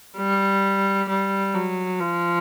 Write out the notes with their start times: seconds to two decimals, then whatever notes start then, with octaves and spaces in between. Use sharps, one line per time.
0.18 G3
1.09 G3
1.54 F#3
2.00 F3